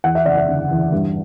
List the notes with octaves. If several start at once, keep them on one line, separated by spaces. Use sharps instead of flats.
E2 F#5
E5
F#1 D5
E5
D3
E2
G2